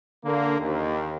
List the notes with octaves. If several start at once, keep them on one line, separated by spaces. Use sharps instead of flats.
D3 A#3
D#2